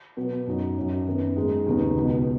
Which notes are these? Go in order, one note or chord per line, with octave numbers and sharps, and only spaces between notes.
B2 F#3 B3
F#2 F#3 D#4
F#2 F#3 C#4
F#2 D#3 B3
G#2 G#3 D#4
D#2 C#3 B3 D#4
C#2 B2 B3